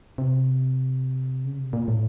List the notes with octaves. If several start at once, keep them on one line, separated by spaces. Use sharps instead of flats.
C3
C#3
C3
A#2
A2